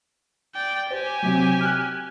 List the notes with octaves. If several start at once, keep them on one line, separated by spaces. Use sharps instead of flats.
D5 G5
G4 C5 G#5
C3 F#3
F6 F#6